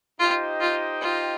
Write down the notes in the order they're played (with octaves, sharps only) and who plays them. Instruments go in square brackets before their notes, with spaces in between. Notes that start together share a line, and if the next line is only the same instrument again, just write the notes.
[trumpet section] D#4 G4 C5 D#5 G5 [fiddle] F4
[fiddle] F4
F4